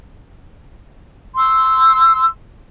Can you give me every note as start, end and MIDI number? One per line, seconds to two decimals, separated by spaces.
1.35 2.25 84
1.35 2.25 88